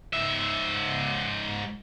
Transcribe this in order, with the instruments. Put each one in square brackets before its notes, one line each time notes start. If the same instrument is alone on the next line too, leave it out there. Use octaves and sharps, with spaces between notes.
[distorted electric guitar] G#2 E5